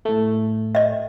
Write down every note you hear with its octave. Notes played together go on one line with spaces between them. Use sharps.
A2 A3
D#5 E5